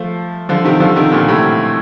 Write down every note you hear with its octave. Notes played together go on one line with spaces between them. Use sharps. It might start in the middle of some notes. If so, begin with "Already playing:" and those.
Already playing: F3 A3
D3 F3
C3 D#3
D3 F3
C3 D#3
A#2 D3
A2 C3